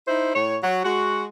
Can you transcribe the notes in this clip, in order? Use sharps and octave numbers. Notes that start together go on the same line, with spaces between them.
D#4 E4 C5
A2 C#5
F#3
G#3 F#4